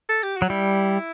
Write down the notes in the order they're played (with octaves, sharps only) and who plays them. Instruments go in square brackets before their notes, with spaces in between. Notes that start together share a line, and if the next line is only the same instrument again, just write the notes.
[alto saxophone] A4
G4
F#4
[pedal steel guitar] F#3
[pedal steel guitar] G3 [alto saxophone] E4